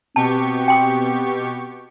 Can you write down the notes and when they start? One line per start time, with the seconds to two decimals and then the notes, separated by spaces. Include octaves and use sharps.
0.16 B2 C4 G4 A5 C#6
0.68 G5 C6 D#6